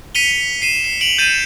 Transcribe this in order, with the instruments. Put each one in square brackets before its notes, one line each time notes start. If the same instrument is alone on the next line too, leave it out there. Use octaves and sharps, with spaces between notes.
[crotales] B6 C#7 D#7 F7 G7
C7 D#7 E7
C7
D7 F7 F#7
G6 A6 C#7 D#7 E7